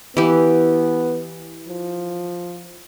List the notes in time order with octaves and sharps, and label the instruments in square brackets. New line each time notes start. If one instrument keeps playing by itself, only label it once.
[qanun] E3 G4 [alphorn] B3
[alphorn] F3